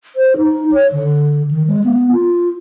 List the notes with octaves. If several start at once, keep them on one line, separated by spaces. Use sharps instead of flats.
C5
D#4
C#5
D3
D#3
G#3
B3
F4